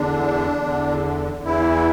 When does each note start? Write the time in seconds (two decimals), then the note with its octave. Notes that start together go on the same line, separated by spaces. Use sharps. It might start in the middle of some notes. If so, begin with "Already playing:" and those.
Already playing: E2 D3 D4
0.63 E2 D3
1.44 E2 E3 E4